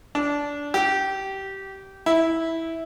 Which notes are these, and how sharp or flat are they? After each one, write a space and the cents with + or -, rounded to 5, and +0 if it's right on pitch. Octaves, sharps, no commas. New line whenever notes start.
D4 -20
G4 -20
E4 -10